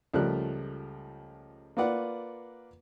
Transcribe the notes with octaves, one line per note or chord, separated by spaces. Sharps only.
C#2 F3 G3 A3 A#4 F#6
A#3 F4 B4 D5 F#5